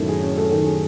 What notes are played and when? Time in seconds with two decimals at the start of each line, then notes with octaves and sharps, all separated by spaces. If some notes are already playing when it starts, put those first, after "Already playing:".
Already playing: F#2 A2 D#3 A3
0.09 G#4
0.23 C#4
0.38 A3
0.52 D#3
0.66 G#4